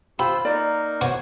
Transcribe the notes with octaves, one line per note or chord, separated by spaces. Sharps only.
F4 G4 C5 B5 E6
A#3 D#4 A#4 D5
D2 B2 F#4 C5 C#5 D6